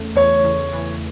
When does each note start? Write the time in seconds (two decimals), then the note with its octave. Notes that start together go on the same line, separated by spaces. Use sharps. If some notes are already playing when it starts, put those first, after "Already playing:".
Already playing: E2 C#3 A3
0.16 E2 C#5
0.44 E2
0.73 E3